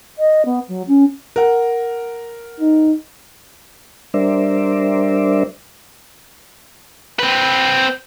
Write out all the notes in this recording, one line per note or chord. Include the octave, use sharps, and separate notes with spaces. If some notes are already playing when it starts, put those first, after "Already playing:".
D#5
B3
F#3
C#4
A#4 F#5
D#4
G3 D4 A#4 C5 D5 E5
C4 B4